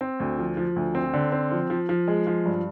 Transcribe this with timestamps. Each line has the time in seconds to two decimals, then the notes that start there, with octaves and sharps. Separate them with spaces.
0.01 C4
0.20 D2
0.38 F3
0.57 F3
0.76 D2
0.95 C4
1.13 D3
1.32 C4
1.51 F3
1.70 F3
1.89 F3
2.08 G#3
2.27 F3
2.46 G2